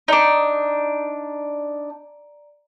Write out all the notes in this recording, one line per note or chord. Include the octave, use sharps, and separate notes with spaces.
D4 D#4 D5 A#5 D7